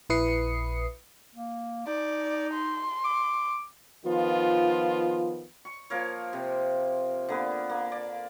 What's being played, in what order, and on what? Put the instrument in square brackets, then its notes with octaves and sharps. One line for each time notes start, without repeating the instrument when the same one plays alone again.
[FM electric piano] A#1 E4 B4 D#6 C7 C#7
[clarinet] A#3
[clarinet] D#4 [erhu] D5
[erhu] C6
[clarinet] D6
[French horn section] D#3 F3 B3 F4
[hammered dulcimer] C#6
F3 A#3 A#4 C#5
C3
D3 A#3 B3
A#3
D5